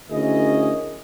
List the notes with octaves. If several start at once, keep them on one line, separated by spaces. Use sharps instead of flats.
D2 C#4 E4 G#4 A#4 D#5